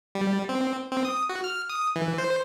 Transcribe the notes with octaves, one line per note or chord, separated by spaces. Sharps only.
G3
C4
C4
D#6
F#4
F6
D#6
E3
C5